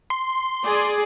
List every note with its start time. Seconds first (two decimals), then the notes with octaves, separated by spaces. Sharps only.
0.10 C6
0.62 G#4 D5 G#5